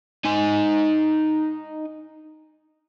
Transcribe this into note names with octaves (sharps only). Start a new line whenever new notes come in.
D#4 G#5